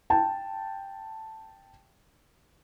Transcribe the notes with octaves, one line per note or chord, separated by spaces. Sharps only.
G5 A5